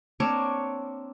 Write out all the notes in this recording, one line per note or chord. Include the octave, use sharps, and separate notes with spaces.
A#3 C4 D4 C#5